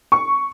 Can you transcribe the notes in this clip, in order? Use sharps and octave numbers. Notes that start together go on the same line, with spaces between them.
C#6